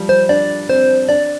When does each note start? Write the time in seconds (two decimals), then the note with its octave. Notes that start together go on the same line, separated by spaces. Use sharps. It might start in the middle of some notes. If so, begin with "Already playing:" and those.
Already playing: F3 G3
0.09 C5
0.29 D4 D5
0.69 C4 C5
1.09 D4 D5